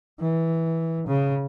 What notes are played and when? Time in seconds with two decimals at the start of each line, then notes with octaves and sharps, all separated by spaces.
0.20 E3
1.07 C#3